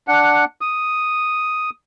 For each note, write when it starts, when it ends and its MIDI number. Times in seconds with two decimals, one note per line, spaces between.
0.08 0.45 62
0.08 0.45 78
0.61 1.70 87